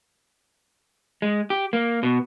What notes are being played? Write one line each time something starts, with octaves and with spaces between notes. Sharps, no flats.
G#3
G4
A#3
B2